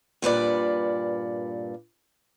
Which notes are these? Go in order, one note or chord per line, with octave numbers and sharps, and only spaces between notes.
G2 A#2 B4 D5